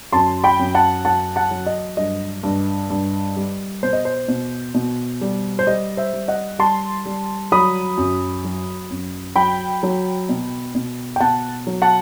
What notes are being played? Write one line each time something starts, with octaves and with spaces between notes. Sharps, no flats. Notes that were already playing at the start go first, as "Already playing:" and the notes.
F#2 A5 C6
G5 B5
F#2
F#5 A5
F#3 F#5 A5
F#5 A5
F#3
D#5
G2 D#5
G2
G2
G3
B2 C5
D#5
C5
B2
B2
G3
C5
G3 D#5
C5 E5
G3
D#5 F#5
G3 A5 C6
G3
F#3 B5 D#6
F#2
F#3
F#2
F#3 G5 B5
F#3
B2
B2
G5
B2 F#5 A5
F#3
F#5 A5